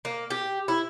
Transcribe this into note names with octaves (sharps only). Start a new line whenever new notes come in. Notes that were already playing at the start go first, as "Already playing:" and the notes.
A#3
G4
E4